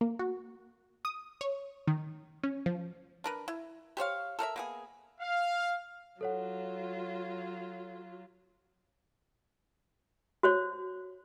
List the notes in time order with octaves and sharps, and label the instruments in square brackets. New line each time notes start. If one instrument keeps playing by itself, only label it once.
[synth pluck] A#3
F#4
D#6
C#5
D#3
C#4
F3
[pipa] D4 A#4 B4
E4
G4 C5 C#5 F5
A4 A#4 D5 E5
A#3 B3 G#4
[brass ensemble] F5
[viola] F#3 F4 [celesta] A4 C#5 F#5
[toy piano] F#4 C5 C#5